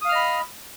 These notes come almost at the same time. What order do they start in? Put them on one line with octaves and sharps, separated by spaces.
D#6 F5 F6 D#5 B5